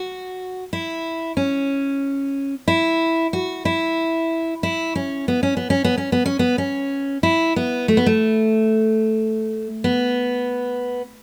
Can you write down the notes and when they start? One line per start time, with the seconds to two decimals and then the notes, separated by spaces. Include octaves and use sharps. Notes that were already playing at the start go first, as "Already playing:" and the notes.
Already playing: F#4
0.73 E4
1.37 C#4
2.68 E4
3.33 F#4
3.65 E4
4.63 E4
4.95 C#4
5.28 B3
5.43 C#4
5.57 B3
5.70 C#4
5.84 B3
5.98 C#4
6.12 B3
6.26 C#4
6.39 B3
6.58 C#4
7.23 E4
7.56 B3
7.88 A3
7.97 B3
8.06 A3
9.84 B3